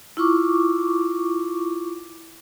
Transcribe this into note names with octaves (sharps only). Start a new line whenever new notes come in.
E4 F4 C#6 D6